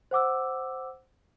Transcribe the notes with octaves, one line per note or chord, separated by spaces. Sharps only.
C5 F#5 D6 E6